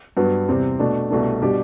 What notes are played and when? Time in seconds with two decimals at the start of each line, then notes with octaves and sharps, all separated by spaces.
0.17 G2 F#3 B3
0.48 E2 C3 G3 C4
0.79 B2 A3 D4
1.10 C2 B2 A3 D4
1.41 B2 G3 D4 G4